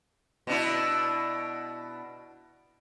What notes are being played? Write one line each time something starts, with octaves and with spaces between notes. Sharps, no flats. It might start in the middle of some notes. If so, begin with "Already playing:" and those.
B2 D4 E4